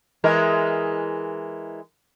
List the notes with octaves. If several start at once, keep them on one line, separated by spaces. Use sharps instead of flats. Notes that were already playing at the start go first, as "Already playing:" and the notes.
E3 G#3 A#4